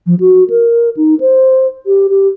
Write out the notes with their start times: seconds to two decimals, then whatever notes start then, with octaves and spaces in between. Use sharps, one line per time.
0.06 F3
0.20 F#4
0.50 A#4
0.97 D#4
1.20 C5
1.86 G4
2.10 G4